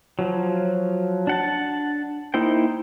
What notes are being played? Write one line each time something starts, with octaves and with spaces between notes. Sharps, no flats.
F3 F#3
D4 F#5 A5
A#3 D#4 E4 C5 G5